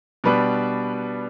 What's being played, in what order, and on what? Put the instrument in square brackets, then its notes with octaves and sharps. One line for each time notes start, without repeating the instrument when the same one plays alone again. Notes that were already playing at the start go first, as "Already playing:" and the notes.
[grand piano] B2 G3 D4 B4